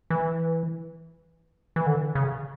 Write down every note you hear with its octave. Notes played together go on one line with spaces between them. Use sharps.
E3
E3
D3
C#3